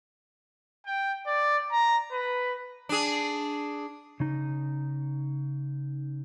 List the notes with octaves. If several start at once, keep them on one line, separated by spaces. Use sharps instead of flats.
G5
D5
A#5
B4
D4 G#4
C#3 D#4